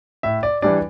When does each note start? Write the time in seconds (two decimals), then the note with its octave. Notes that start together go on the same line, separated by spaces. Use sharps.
0.23 A2 E5
0.43 D5
0.62 E3 G3 D4 D5